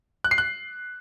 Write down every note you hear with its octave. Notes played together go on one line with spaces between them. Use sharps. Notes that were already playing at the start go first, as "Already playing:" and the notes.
F#6
C7
F#6